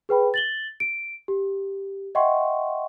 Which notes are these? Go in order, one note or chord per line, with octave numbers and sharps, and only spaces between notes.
G#4 B4 G5 B5
A6 F#7 G7
D7
G4
D#5 E5 F#5 G5 C6 C#6